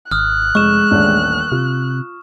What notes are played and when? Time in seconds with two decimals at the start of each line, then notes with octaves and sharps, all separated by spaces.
0.11 G#1 D#6 F6 F#6
0.55 F1 G#3 C#6 E7
0.91 D#1 A1 D4
1.52 C3 F4